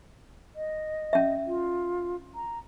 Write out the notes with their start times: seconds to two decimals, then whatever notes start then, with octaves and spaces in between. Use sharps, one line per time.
0.56 D#5
1.13 C#4 E5
1.47 F4
2.35 A#5